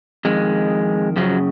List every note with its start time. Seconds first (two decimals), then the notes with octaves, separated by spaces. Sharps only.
0.25 F2 D#3 G#3
1.16 F#2 C#3 F3 F#3